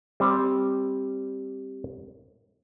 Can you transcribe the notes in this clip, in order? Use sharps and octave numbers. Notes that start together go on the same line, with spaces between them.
G3 C4